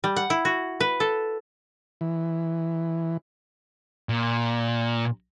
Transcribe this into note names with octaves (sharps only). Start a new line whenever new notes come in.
G3
F#5
E4
F#4
B4
A4
E3
A#2